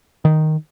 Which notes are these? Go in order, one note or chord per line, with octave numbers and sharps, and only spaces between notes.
D#3